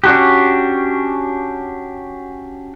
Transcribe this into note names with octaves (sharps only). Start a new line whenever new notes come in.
C#4 D4 F#4 G4